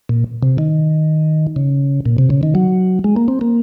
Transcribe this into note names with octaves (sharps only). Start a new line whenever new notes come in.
A#2
C3
D#3
C#3
A#2
C3
C#3
D#3
F#3
G#3
A#3
C4
A#3